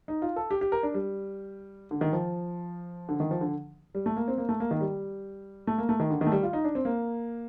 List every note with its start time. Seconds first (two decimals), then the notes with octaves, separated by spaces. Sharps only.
0.08 D#4
0.22 F4
0.36 A4
0.51 G4
0.61 G4
0.72 A#4
0.83 D4
0.94 G3
1.91 D3
2.01 D#3
2.13 F3
3.09 D3
3.20 D#3
3.31 F3
3.41 D3
3.95 G3
4.06 A3
4.16 A#3
4.28 C4
4.38 A#3
4.49 A3
4.60 A#3
4.71 D#3
4.81 G3
5.67 A3
5.78 A#3
5.89 A3
6.00 D#3
6.10 D3
6.21 D#3
6.27 A3
6.32 G3
6.43 F4
6.53 D#4
6.64 D4
6.75 C4
6.85 A#3